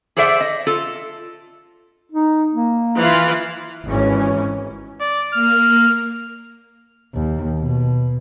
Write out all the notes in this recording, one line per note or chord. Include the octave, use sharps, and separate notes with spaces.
G#4 A4 C5 D5 E5 F#5
D#5
F4 A4
D#4
A#3
E3 F4
G#1 G#2 E3 C#4
D5
A#3 F6
D#2
B2